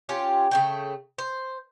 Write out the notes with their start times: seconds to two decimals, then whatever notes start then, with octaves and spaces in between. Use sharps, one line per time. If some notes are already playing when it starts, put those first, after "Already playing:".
0.09 C#4 F4 G4
0.51 C#3 A3 G5
1.18 C5